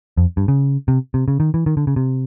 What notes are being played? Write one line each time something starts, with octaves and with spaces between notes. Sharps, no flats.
F2
G2
C#3
C3
C3
C#3
D#3
E3
D#3
D3
C#3
C3